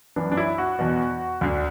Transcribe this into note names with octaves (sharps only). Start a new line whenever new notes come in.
F#2 E3 D4
D4
E4
F#4
E2 B2
D2 D3